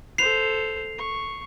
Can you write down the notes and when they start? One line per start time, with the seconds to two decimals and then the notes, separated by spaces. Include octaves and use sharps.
0.18 A4 C5 C7 F7
0.98 C#6